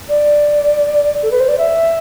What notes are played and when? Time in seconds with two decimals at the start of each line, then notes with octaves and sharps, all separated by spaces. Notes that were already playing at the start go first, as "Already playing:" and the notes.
0.09 D5
1.22 A4
1.31 B4
1.40 C5
1.48 D5
1.58 E5